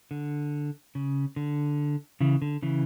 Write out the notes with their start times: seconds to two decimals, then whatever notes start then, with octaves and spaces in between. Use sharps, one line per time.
0.11 D3
0.95 C#3
1.36 D3
2.21 C#3 E3
2.42 D3
2.62 C#3 E3